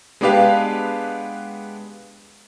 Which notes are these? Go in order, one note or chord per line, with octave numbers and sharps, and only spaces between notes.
G#3 B3 D4 G4 B4 F5